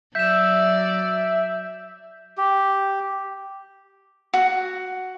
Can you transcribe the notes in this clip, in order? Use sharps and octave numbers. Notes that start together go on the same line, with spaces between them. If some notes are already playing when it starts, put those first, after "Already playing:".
F#3 D5 E5 G6 E7
G4
F#4